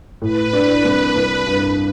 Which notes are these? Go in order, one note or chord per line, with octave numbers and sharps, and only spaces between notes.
A2 B4
D4
C2
C2
G2